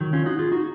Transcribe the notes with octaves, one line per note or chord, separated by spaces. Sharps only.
D#3 F#3
C#4 F4
D#4 F#4
F4 G#4
D#4 F#4